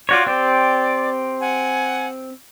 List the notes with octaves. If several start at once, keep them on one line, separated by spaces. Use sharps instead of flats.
F4 F#4 C#5 D5 G5 D6
C4 G4 D5
F#5 G#5